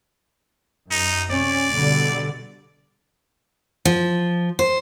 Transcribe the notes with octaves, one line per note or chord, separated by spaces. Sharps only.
F#2 D#4
C3 C#4 D5
B2 D3 G3
F3
C5